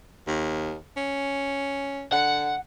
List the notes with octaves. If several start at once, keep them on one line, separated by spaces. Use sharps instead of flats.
D#2
C#4
D3 F#5